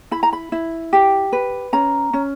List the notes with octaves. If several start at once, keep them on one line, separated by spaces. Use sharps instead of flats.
E4 B5
A#5
B5
E4
G4
B4
C#4 A#5
C#4